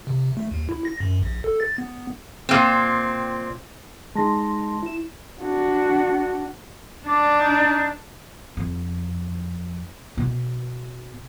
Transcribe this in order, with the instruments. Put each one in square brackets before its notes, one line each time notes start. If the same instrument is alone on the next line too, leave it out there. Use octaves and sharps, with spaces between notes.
[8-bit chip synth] C3
A3
D#2
E4
A#6
F#2
A#1
A4
A6
B3
[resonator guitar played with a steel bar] A#2 C4
[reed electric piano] G#3 D#4 [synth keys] A5 C6 A#6
[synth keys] E4 E7
[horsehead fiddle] D4 F#4
[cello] D4 [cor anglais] D5
[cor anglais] D#4
[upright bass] F2
B2